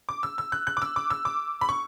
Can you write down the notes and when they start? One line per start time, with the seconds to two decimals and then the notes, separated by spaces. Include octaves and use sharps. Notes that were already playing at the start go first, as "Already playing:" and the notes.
0.09 D6
0.23 E6
0.38 E6
0.52 F#6
0.67 F#6
0.77 D6
0.82 E6
0.96 D6
1.10 E6
1.25 D6
1.61 B5
1.69 C#6